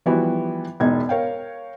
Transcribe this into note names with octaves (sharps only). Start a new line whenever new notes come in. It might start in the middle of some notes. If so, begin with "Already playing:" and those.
E3 F3 G3 B3 E4 F#4
E1 E2 D#4 G#6
A#4 C#5 F5 G5